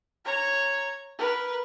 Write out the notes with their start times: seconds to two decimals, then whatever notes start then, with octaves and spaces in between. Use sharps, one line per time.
0.25 C#5 A#5
1.19 A#4 B4